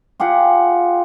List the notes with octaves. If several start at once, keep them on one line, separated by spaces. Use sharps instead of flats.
F4 G4 G#4 F#5